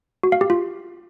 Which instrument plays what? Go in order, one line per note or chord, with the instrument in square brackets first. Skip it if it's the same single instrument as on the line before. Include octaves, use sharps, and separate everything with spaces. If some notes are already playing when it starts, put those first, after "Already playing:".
[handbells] F#4
F5
G4
F4